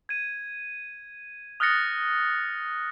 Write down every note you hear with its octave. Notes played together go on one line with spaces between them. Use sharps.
G#6 D#7
D#6 F6 F#6 A6 A#6 C#7